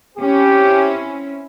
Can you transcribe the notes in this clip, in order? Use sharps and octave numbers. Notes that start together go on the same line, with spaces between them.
C4 C#4 E4 G4